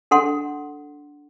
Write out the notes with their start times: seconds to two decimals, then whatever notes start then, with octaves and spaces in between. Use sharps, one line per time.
0.11 D4 A4 F#5 C6